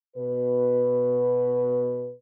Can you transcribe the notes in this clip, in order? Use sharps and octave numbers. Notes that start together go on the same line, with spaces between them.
B2 B4